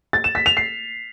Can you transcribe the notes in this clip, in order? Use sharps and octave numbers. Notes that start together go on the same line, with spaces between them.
A6
E7
B6
F7
C7